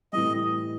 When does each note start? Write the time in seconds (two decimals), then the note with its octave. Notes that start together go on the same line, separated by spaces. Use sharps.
0.13 A2 E3 G3 D#5